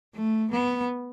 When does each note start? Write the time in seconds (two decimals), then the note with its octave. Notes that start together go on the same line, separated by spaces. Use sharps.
0.15 A3
0.51 B3